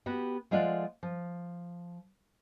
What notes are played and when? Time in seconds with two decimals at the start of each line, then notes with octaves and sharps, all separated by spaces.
0.06 B3 F#4 G4
0.51 F3 G#3 A3 F4 D5 F#5
1.03 F3